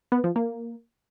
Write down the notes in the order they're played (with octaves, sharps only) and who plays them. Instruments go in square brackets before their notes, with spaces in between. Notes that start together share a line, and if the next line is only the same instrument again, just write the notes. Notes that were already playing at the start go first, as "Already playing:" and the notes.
[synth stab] B3
F3
A#3